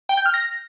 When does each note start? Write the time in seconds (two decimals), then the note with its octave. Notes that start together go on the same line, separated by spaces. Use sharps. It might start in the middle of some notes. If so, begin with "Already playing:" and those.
0.09 G5
0.17 G6
0.26 F6
0.34 A#6